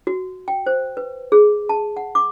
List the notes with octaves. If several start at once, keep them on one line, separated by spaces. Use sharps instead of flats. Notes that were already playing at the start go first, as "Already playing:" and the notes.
F#4
G5
C5
B4
G#4
A5
F#5
D6